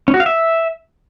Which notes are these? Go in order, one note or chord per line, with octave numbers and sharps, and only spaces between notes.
C#4
F#4
F5
E5